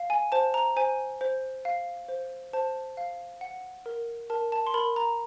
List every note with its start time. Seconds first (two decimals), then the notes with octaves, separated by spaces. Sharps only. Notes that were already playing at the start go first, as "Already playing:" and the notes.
Already playing: F5
0.10 G#5
0.32 C5 A5
0.54 A#5
0.76 C5 G#5
1.21 C5
1.65 F5
2.09 C5
2.53 C5 A5
2.97 F5
3.41 F#5
3.86 A#4
4.30 A#4 A5
4.52 A5
4.67 C6
4.74 A#4 B5
4.96 A#5